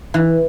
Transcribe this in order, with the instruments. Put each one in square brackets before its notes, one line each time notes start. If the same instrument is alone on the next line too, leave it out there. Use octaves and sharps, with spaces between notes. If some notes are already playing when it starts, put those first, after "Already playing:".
[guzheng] E3